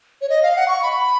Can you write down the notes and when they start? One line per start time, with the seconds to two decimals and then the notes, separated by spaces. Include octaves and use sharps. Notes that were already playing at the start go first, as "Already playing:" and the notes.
0.22 C#5
0.29 D#5
0.43 F5
0.56 F#5
0.68 C#6
0.83 B5